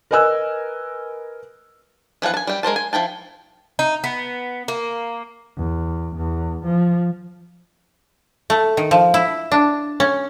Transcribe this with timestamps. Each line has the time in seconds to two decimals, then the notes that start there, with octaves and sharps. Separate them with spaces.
0.11 A#4 B4 D#5 G#5 E6 F#6
2.22 E3 F3 B3 F#5
2.34 G#5 A5
2.47 G3 G5
2.63 G#3 A#4 C5 A5
2.76 G#5
2.93 F3 E4 G5 A5
3.79 D#4
4.04 B3
4.68 A#3
5.57 E2
6.16 E2
6.65 F3
8.50 A3
8.77 D#3
8.91 F3
9.14 E4
9.52 D4
10.00 C#4